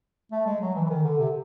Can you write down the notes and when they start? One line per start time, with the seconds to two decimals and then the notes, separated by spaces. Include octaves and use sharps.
0.32 A3
0.47 G#3
0.61 F#3
0.75 E3
0.85 E3
0.90 D#3
1.04 D3
1.18 C3